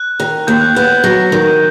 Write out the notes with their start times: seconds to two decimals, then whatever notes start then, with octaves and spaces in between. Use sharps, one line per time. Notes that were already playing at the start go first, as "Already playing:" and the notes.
Already playing: F#6
0.20 D#3
0.47 D#2 G6
0.61 F#6
0.75 B3 G6
1.04 F#3
1.32 D#3